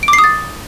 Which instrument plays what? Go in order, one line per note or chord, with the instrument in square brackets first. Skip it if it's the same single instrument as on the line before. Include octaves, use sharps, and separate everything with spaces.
[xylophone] D7
D6
C7
D#6
A6